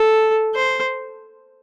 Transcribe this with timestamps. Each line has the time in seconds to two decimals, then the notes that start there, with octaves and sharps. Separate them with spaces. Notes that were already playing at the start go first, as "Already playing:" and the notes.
Already playing: A4
0.55 C5